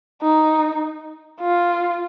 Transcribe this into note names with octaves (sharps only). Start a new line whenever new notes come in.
D#4
F4